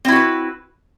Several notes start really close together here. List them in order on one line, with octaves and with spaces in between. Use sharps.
C4 E4 F#4 B4